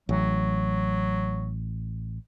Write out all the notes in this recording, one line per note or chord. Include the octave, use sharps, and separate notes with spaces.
A1 F#3